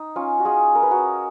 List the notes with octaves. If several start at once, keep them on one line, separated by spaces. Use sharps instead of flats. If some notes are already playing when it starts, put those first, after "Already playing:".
Already playing: D#4
C#4 F4
F#4
F4 G#4
A#4
B4
F#4 A#4